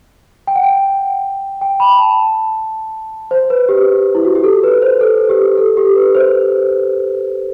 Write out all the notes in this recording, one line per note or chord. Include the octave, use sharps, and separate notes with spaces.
G5
F#5
G5
G5
B5
A5
C5
B4
G4
E4
F#4
G4
A4
B4
C5
A4
G4
A4
G4
B4
C5